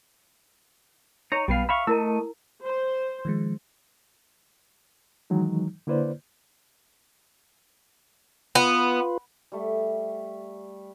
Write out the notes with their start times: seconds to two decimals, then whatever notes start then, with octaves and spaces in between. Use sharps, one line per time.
1.32 D#4 C#5 A#5
1.48 B1 G3 B3 F5 C7
1.69 E5 F5 B5 C#6
1.87 A3 E4 A#4 D#5 A#5 E6
2.62 C5
3.25 D#3 F3 G#3
5.30 D#3 E3 F#3 G#3 D#4
5.87 D3 A#3 E4 B4 C5 D5
8.55 B3 F4 B4
9.52 G3 A3